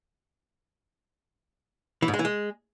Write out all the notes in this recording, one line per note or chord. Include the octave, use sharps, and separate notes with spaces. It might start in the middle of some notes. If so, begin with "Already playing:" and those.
E3
G#2
G#3
E3
G#3